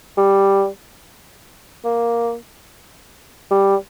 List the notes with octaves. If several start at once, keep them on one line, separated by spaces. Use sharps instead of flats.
G3
A#3
G3